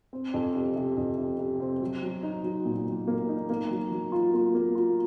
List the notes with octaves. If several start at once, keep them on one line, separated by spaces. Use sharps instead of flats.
C4
F2
C3
C3
F2
C3
C3
C4
F#3
F#3
D#4
F#3
A#2
F#3
A#3
D#4
A#3
F#3
F#3
F4
A#3
A#3
F4